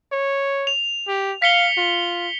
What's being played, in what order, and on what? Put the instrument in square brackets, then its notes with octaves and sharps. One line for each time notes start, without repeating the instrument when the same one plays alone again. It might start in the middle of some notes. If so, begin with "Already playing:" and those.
[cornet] C#5
[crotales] F7
[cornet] G4
[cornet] F5 [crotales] B6 C#7 G7
[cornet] F4